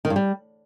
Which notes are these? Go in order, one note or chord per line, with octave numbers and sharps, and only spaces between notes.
D#3
G2
G3